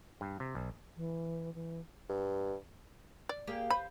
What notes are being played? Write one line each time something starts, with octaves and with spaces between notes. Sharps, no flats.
G2
C3
B1
E3
E3
G2
D5
A#3 G4 G#4
B4 C5 B5